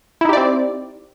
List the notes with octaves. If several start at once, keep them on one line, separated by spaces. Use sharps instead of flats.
C4 D#4 E4 G4 D5